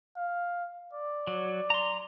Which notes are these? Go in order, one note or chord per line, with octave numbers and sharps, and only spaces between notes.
F5
D5
F#3
A#5 C6